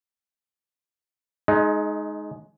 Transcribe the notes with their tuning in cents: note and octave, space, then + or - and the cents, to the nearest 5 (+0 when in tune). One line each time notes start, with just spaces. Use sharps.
G#3 +25 D#4 +0